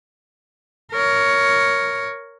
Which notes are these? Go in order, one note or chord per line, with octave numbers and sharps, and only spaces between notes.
A#4 C#5